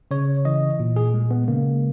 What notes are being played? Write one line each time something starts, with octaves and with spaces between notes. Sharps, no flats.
C#3 C#5
E3 D#5
A#2
G#4
G#3
B3
C#3 A#3